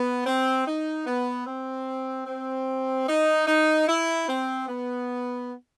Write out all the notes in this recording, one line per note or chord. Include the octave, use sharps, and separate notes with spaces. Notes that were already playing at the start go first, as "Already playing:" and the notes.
Already playing: B3
C4
D#4
B3
C4
C4
D#4
D#4
E4
C4
B3